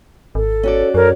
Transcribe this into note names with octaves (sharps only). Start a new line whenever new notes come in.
G#1 A4
C#4 F#4 D5
F#2 A4 A#4 C#5